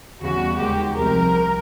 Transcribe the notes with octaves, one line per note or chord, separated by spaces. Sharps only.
E2 C#3 E3 G3 F#4
D#2 D#3 G#3 G4
C2 C3 F3 G#3 A#4